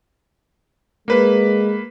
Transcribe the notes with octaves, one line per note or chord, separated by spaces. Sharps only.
G#3 A#3 B4